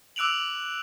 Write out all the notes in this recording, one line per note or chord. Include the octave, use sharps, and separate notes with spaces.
D6 E6 F#6 D7 F7 F#7